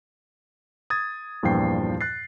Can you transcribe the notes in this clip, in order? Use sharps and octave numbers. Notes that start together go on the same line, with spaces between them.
D#6 G#6 A6
E2 G2 A#2 F3 G5 C7
F#6 A6 C7